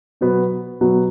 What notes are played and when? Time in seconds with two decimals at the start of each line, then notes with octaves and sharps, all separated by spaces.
0.21 B2 F#3 B3 F#4
0.81 B2 F#3 B3 F#4